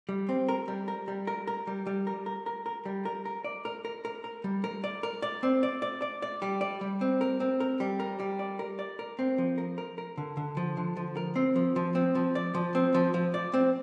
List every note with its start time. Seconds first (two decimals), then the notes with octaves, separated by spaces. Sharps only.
0.09 G3
0.29 C4
0.49 A#4
0.68 G3
0.88 A#4
1.08 G3
1.27 A#4
1.47 A#4
1.67 G3
1.87 G3
2.07 A#4
2.26 A#4
2.46 A#4
2.66 A#4
2.85 G3
3.05 A#4
3.25 A#4
3.44 D5
3.65 A#4
3.85 A#4
4.05 A#4
4.24 A#4
4.44 G3
4.64 A#4
4.84 D5
5.03 A#4
5.22 D5
5.43 C4
5.63 D5
5.82 D5
6.02 D5
6.22 D5
6.42 G3
6.61 D5
6.81 G3
7.01 C4
7.21 A#4
7.40 C4
7.60 A#4
7.80 G3
8.00 A#4
8.20 G3
8.39 D5
8.59 A#4
8.79 D5
8.99 A#4
9.19 C4
9.38 F3
9.58 A#4
9.78 A#4
9.98 A#4
10.18 D3
10.37 D3
10.57 F3
10.77 D3
10.97 F3
11.17 A#4
11.36 C4
11.56 F3
11.76 F3
11.95 C4
12.15 F3
12.35 D5
12.54 F3
12.75 C4
12.94 F3
13.14 F3
13.34 D5
13.54 C4